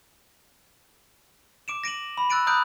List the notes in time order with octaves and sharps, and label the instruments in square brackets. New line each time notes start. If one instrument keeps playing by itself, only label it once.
[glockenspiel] D6 D7 E7
A#6 D7 D#7 F#7
B5
E6 F#6 A6 D7 D#7
A#5 B5 D#6 F#6 G6 D7